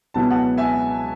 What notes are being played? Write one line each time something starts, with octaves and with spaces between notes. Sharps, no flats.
C#2 B2 F#3 B3 E4 A5
F#5 A5
E5 G#5